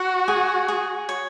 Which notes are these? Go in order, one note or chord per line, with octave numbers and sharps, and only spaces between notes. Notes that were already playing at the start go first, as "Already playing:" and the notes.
Already playing: F#4 F#5
G#4
G#4
C#5